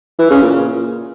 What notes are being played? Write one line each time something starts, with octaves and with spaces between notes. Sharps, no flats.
E3
C#3
A#2